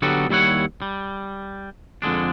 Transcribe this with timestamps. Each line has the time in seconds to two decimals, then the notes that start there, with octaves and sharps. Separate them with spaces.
0.02 D3 F#3 B3 F#4 G4 A4
0.29 D#2 G3 E4 C#5 F#5
0.82 G3
2.02 F2 D3 G#3 D4